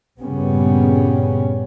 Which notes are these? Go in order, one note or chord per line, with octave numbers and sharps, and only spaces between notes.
G2 A#2 C#3 G3 B3 C#4